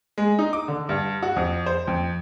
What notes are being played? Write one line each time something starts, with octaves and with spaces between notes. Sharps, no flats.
G#3
D#4
D6
D3
G2
F#4
F2
C5
F2